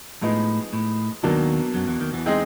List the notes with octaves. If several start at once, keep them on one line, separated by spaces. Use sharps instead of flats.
A2 F3 G#3 B3 D#4 G#4
A2
D#2 B2 D#3 F#3 A#3 D4
F#2 F#3
E2 E3
D#2 D#3
E2 E3
G#3 C4 D#4 G#4